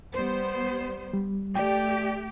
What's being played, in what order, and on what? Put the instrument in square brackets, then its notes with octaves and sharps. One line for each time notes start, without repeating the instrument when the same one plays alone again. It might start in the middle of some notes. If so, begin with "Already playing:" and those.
[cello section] G3 B3 C5
[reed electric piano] G3
[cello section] A3 G4 [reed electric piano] D5 G5